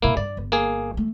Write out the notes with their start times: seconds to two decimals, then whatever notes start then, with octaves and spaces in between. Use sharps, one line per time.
0.02 G2 B2 A#3 E4
0.17 G2 D5
0.37 G1
0.52 A#3 G#4
0.94 E3 A3